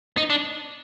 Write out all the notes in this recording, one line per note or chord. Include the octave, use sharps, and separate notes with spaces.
D#4
D4